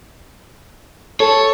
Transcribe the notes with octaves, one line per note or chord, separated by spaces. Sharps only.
A4 C#5